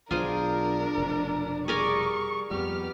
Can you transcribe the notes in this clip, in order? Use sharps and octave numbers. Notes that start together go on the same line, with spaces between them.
B1 D4 F4 G#4 A#4 C5
F1 B2
G3 G#4 A#4 D5 C#6
F2 G3 B3 G4 F6